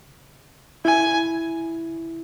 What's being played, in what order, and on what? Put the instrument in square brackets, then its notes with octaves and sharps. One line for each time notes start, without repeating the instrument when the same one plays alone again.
[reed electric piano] E4 [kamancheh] G#5